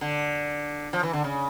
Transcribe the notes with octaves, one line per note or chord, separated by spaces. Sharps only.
D3
F3
E3
D3
C#3